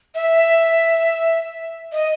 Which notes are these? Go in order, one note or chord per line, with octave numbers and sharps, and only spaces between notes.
E5
D#5